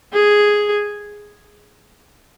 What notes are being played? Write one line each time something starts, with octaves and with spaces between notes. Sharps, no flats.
G#4